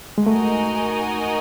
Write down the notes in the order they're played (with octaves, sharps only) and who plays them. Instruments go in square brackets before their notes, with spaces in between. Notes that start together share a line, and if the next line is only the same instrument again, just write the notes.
[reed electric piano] G#3
[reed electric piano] A3 [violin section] D#4 F#4 A#4 D#5 G#5